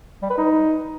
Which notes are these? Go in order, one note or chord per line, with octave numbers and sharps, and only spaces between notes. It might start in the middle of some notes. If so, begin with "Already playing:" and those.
G3
B4
D#4